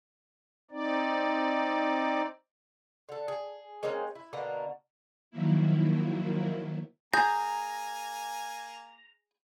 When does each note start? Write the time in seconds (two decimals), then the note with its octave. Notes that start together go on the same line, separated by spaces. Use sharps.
0.71 C4 D#4 D5
3.09 D3 A4
3.28 G#4
3.83 G#3 A#3 C4 C#4
4.15 E4
4.33 B2 D3 A#3 A#5
5.31 D#3 F3 F#3 A#3 E4
7.13 A#3 G#4 G#5 A#5 G6